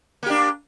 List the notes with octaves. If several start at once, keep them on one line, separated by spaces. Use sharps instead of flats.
A#3 D4 G4